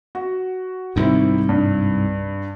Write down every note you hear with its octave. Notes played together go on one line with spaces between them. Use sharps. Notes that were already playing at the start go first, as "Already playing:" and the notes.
F#4
C2 G#2 D#3 C4 E4
G2